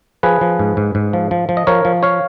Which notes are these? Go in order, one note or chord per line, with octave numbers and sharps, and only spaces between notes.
F3 G#4 B4
F3
G#2
G#2
G#2
F3
F3
F3
D#5
F3 A#4 C#5
F3
C#5 F5